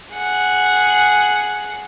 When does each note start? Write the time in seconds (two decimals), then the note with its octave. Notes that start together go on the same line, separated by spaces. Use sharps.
0.14 G#4 F#5